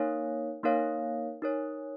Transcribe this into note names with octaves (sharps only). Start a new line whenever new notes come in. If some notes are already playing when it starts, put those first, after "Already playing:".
Already playing: A#3 D#4 A#4 C#5 F5
A#3 D#4 A#4 C#5 F5
D#4 A#4 C#5